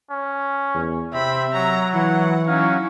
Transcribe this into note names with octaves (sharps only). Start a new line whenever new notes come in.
C#4
E2
C3 C4 E5 B5
F#3 A#5
E3 E4 F#5
F#3 C#4 D#4 E4 F5